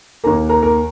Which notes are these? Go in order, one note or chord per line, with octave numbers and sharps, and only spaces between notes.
D#2 D#3 A#3 A#4 A#5
A#4 A#5
A#4 A#5